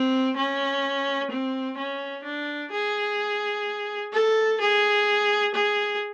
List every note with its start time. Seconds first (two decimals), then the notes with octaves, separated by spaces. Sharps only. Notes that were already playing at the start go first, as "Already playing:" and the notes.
Already playing: C4
0.36 C#4
1.30 C4
1.78 C#4
2.24 D4
2.71 G#4
4.13 A4
4.60 G#4
5.54 G#4